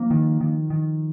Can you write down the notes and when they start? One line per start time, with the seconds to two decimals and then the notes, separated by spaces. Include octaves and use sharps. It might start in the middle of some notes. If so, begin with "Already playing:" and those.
Already playing: F3 A#3
0.11 D#3
0.41 D#3
0.70 D#3